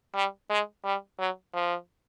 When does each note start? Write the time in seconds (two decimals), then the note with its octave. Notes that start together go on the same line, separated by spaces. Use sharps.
0.15 G3
0.50 G#3
0.84 G3
1.19 F#3
1.54 F3